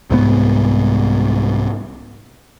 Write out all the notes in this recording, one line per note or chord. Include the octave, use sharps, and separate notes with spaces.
C2 G#2 B3